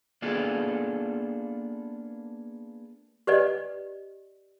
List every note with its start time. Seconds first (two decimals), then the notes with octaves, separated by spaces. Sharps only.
0.22 A#3 B3 D4 F4 G#4 A4
3.27 G4 B4 D5 D#5